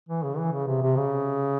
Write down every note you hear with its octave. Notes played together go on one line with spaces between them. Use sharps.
E3
C#3
E3
C#3
C3
C3
C#3